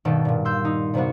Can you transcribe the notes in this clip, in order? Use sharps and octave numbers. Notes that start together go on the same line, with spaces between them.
G2 B2 D#3 A4
G2 A#2
C6 E6 G6
D#4
G2 C3 A#3 B3 F#4